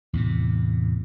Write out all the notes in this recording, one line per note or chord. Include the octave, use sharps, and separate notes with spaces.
E2 A2 C3